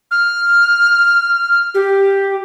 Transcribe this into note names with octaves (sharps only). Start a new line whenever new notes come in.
F6
G4